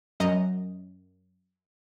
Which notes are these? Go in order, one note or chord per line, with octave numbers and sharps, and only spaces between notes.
F#2 D#5 A#5